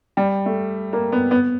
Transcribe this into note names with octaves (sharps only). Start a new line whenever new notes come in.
G3
A3
A#3
B3
B3